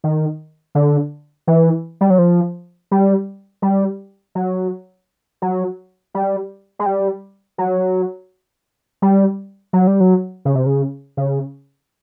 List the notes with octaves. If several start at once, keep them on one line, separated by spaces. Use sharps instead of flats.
D#3
D3
E3
G3
F#3
F3
G3
G3
F#3
F#3
G3
G#3
G3
F#3
G3
F#3
G3
F#3
C#3
C3
C#3
C#3